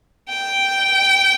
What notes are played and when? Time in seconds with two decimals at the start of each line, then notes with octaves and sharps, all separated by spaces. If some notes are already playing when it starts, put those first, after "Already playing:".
0.29 G5